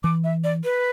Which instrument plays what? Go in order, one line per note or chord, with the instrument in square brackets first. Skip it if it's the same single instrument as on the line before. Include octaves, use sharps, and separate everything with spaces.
[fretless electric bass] E3 [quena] D6
[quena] E5
D5
B4